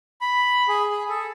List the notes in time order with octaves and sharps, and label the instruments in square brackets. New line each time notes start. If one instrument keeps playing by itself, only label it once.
[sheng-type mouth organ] B5
G#4
G#4
A4